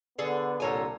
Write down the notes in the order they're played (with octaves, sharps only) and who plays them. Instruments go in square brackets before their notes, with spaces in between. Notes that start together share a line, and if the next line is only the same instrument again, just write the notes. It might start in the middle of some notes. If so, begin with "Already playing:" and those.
[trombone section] D3 B3 [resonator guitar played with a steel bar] G#4 A4 D5
[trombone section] C2 D3 A4 [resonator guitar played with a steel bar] A#2 C#5 G#5